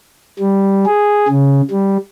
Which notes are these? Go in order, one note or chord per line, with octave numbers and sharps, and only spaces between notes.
G3
G#4
C#3
G3